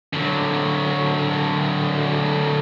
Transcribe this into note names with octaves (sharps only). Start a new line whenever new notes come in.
D3 F#3